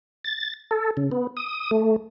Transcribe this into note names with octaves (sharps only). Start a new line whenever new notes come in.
A6
A4
C#3
B3
D#6
A3